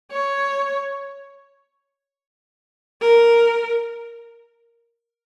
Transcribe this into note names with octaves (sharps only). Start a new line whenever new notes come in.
C#5
A#4